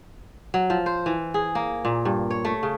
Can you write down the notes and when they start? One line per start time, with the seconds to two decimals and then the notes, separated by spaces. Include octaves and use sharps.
0.54 F#3
0.70 F3
0.86 C5
1.06 E3
1.34 G#4
1.55 A#3
1.85 A#2
2.05 G2
2.30 C#5
2.45 A3
2.63 C#3